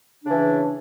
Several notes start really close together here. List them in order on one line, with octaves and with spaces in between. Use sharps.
D4 C#3 E3